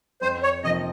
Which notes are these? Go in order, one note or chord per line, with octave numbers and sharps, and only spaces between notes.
F2 C5
C#5
C3 F3 A#3 D#4 D#5